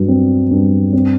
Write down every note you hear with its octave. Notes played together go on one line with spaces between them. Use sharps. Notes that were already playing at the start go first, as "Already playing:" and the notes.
Already playing: G2 F#3
C4
G2
C4